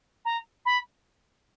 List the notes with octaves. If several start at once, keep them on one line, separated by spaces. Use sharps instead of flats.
A#5
B5